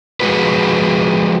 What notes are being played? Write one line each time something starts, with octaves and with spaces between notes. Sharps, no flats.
F3 G#3 C4 F4 F#4 B4